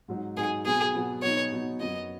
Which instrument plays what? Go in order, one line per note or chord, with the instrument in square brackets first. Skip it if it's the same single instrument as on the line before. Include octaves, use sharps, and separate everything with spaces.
[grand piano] G#2 F#3 D#4
[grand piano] G#2 F#3 D#4 [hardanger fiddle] G#4
[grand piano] B2 F#3 B3 [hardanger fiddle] G#4
[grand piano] B2 F#3 B3
[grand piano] B2 F#3 B3 D#4 [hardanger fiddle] C#5
[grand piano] B2 F#3 B3 D#4
[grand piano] F#2 F#3 B3 F#4 [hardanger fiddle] D#5